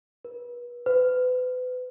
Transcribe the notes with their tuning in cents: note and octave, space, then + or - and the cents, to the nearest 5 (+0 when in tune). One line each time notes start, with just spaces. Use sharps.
B4 -35
B4 +35